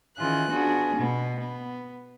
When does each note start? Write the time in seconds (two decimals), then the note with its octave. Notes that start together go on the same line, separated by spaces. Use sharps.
0.18 D#3 E3 C#4 F4 G#4 F#6
0.51 B3 D4 F4 F#4 G#4
0.97 B2 B3
1.41 B3